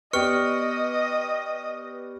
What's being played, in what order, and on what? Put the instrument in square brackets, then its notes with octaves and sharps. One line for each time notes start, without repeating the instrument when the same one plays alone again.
[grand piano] B3 G4 D5 [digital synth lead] B4 [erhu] D#5 [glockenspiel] C#6 F6 C#7